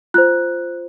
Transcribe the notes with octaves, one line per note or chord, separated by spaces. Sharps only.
F4 C5 F#6